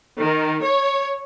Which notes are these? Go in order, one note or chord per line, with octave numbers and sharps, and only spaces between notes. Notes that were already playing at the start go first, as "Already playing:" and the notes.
D#3
C#5